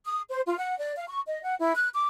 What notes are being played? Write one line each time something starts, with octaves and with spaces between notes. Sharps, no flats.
D#6
C5
F4
F#5
D5
F5
C#6
D#5
F#5
E4
F#6
D6